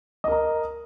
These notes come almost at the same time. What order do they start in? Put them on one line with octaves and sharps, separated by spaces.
D#5 A#4 A#5